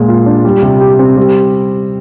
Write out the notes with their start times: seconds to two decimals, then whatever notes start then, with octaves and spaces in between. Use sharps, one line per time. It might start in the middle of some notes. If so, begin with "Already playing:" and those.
Already playing: A#2 G#3
0.08 F4
0.26 D4
0.45 G3
0.62 C3
0.81 G4
0.99 C4
1.17 G3